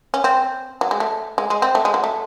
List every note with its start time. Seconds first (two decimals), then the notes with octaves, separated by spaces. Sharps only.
0.14 C#4
0.24 C4
0.81 F#3
0.91 G#3
1.00 A3
1.38 G#3
1.50 G#3
1.62 C4
1.75 A3
1.85 G#3
1.94 F#3
2.04 A3